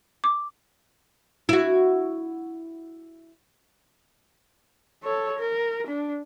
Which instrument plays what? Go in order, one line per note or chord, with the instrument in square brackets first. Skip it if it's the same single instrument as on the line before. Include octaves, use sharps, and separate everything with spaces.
[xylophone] D6
[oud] E4 F#4
[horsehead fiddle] A4 C#5
A#4
D4